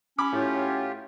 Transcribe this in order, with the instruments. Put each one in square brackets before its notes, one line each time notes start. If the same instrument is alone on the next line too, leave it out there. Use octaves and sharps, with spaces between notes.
[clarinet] C#4 [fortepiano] B5 D6
[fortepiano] A2 [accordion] F#3 F4 G4